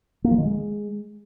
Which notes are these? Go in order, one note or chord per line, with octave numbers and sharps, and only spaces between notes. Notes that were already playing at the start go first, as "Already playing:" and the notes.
A#3
F3
D#3
G#3